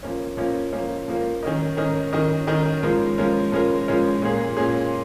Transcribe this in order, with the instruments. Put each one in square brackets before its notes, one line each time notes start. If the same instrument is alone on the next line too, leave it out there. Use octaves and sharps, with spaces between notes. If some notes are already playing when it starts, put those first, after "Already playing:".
[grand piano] F3 A#3 C#4
F3 A#3 C#4
F3 A#3 C#4
F3 A#3 C#4
D#3 C#4 A#4 D#5
D#3 C#4 A#4 D#5
D#3 C#4 A#4 D#5
D#3 C#4 A#4 D#5
F3 G#3 C#4 A#4
F3 G#3 C#4 A#4
F3 G#3 C#4 A#4
F3 G#3 C#4 A#4
A#2 A#3 C#4 G#4
A#2 A#3 C#4 G#4